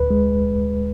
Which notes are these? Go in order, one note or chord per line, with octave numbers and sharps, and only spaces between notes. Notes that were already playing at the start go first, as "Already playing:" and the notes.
Already playing: D2 B4
G#3